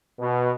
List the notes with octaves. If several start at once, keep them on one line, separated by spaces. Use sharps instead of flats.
B2